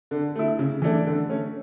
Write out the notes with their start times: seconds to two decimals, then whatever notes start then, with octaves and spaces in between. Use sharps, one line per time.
0.11 D3
0.35 A3 E4
0.59 C#3
0.82 E3 A3 D4
1.07 D3
1.29 A3 C#4